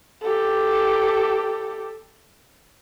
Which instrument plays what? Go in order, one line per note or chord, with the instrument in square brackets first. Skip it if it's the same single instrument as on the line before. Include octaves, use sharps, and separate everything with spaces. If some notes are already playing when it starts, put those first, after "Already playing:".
[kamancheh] G4 A4